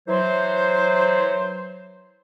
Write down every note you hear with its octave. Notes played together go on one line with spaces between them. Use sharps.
E3 F#3 C5